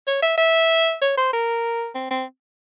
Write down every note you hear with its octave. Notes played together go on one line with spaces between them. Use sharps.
C#5
E5
E5
C#5
C5
A#4
C4
C4